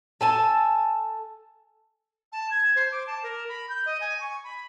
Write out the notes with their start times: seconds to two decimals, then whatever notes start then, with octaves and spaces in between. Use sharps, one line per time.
0.21 A4 G#5 A5
2.32 A5
2.51 G#6
2.76 C5
2.92 D6
3.07 A5
3.23 A#4
3.49 B5
3.69 G6
3.86 D#5
4.01 G#5
4.20 C#6
4.44 B5